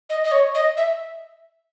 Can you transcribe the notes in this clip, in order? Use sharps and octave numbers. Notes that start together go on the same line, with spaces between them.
D#5
D#5
C#5
D#5
E5